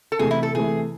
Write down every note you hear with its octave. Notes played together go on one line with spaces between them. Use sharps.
A4
C3 E3 A3 G#4
E4
A4
C3 E3 A3 G#4